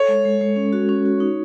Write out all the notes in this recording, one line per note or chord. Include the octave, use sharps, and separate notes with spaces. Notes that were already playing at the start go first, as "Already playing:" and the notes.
Already playing: A4 C#5
G#3
G#3
G#3
C#4
F#4
C#4
F#4
D#4